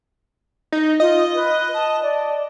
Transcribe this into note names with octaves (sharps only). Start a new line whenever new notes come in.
D#4
F4 D#5
B4
A5
D5